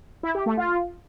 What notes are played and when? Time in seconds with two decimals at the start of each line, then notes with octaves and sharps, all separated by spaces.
0.23 E4
0.35 G4
0.46 A3
0.57 F4